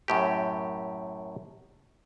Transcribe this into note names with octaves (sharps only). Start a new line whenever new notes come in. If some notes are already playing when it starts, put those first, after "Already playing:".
F#2 A2 G4